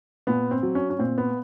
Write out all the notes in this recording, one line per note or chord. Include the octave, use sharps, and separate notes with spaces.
A#2 B3
C4
F#3
C#4
C#4
A#2 C4
B3